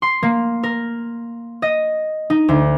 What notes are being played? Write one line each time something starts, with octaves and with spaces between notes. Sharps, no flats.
C6
A#3
A#4
D#5
D#4
D2